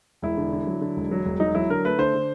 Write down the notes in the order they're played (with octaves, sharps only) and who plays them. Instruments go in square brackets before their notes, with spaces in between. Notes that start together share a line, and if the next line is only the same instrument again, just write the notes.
[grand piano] E1 E4
D3
D3
F#3
D3
E1
F#3
E1
F#3 D#4
F#3 E4
D3 A#4
A3 B4
D3 C5
D3